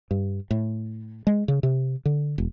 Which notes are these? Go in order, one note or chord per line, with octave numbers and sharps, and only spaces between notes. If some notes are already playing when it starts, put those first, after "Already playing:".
G2
A2
G#3
C#3
C3
D3
E1